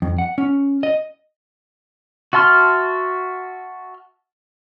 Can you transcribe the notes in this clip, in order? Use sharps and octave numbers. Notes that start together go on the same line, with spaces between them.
F2
F#5
C#4
D#5
F#4 E5 A5 C6 F6